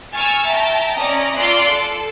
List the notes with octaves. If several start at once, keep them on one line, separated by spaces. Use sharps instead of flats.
G#5 C#6 E6 F6 A6
E5 G5 A5 A#5
C#4 D5 D#5 A#5
F4 D5 C6 D6 E6 F#6
A4